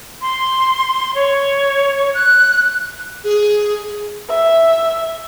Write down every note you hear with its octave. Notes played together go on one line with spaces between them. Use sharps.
C6
C#5
F#6
G#4
E5